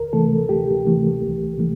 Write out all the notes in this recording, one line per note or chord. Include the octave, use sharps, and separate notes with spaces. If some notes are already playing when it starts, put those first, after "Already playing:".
Already playing: D2 A#4
C3 E3 A3 A4
D2 G4
C3 E3 A3
C2
C3 E3 A3